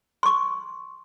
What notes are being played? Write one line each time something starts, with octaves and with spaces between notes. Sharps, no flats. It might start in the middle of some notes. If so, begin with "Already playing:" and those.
C6 C#6